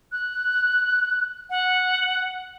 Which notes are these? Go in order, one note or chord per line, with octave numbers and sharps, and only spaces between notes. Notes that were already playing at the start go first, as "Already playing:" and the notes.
F#6
F#5